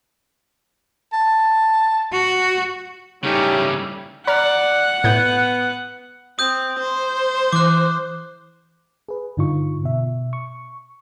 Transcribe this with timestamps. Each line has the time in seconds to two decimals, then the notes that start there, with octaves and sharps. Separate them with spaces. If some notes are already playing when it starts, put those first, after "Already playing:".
1.13 A5
2.13 F#4
3.23 C#3 G3 A3 C#4 D#4 E4 G4
4.27 D5 F#5 A#5 F6
5.04 A2 B3 G6
6.39 C4 D#6 G6
6.79 C5
7.53 E3 D6 F#6
9.09 G#4 B4
9.37 G2 D3 D#4 F4 C#6
9.84 B2 E5
10.33 C#6